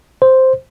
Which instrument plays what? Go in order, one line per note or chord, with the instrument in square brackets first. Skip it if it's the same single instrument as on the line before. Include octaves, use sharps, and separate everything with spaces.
[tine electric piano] C5